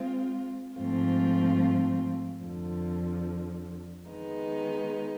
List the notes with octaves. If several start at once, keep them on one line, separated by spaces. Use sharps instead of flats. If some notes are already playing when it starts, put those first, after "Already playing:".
Already playing: G#3 C4 F4
G#2 F3 A3 C4 F4
F2 D3 F3
D#3 G#3 B3 D#4